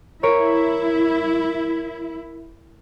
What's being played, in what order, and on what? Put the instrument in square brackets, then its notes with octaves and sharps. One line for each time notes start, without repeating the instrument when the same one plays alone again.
[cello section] E4 [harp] A#4 C#5 D7